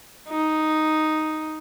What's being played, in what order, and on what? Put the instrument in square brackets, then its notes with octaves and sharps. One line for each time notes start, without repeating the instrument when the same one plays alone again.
[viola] D#4